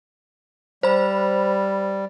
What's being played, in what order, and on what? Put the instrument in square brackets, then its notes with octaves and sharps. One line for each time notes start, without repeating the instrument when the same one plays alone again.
[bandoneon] G3 [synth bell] C5 B5